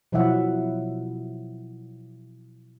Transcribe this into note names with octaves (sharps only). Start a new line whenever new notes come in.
B2 F3 F#3 E4 E5 F#5